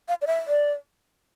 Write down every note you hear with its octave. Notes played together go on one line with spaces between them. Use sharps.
F5
D5
E5
D5